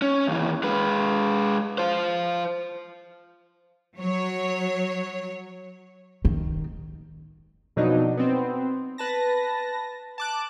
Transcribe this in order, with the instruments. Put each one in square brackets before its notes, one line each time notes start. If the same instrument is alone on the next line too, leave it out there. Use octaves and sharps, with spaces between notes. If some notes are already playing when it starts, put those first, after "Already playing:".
[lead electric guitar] C#4
D#2 E3
G#3 B4
F4 C5
[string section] F#3 C#5
[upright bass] D#3
[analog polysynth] F2 B2 F#3 D4 D#4
B3 C4
B4 A5 A#6
A5 D6 F#6